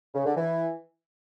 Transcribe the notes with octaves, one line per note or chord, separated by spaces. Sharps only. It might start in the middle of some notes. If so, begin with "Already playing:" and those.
C#3
D3
E3